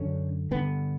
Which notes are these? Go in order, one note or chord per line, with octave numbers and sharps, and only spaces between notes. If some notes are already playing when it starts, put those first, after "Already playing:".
Already playing: F#2 D3 C#4
G2 D3 B3